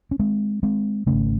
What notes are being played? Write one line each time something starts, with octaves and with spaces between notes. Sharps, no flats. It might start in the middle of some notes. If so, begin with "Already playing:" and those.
C#4
G#3 C4
G#3 C4
G#1 F#2 C#3 A3 C#4